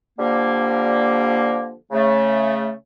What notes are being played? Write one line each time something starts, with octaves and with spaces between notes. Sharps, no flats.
D3 F3 G3 A#3
C#3 A3